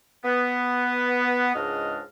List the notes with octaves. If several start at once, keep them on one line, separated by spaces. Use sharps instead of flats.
B3
C#2 G#2 D4 D#5 F6